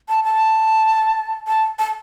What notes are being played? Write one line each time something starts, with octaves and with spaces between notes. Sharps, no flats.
A5
A5
A5
A5